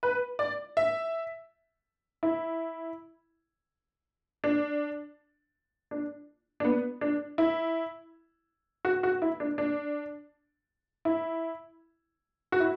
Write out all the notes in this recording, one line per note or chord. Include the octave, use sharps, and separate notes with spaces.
B4
D5
E5
E4
D4
D4
D4
B3
D4
E4
F#4
F#4
E4
D4
D4
E4
F#4
E4